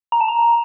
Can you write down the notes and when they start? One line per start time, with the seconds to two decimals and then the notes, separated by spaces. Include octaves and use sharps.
0.12 A#5
0.21 A5
0.28 A#5